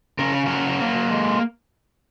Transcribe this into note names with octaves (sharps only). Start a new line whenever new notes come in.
C#3 A#4
C#5
F#3 F#4 A#4
A#3
G#3